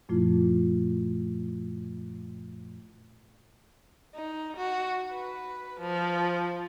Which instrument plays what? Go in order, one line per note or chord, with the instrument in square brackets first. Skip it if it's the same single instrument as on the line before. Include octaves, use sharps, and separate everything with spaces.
[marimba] F#2 A#2 F3 A3 E4 F4
[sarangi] D#4
F#4
B4
F3